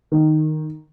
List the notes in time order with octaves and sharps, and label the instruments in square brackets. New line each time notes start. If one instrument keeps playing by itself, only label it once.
[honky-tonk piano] D#3